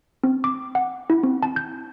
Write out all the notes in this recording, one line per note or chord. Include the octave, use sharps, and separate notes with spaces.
C4
D6
F#5
E4
C4
A5
G6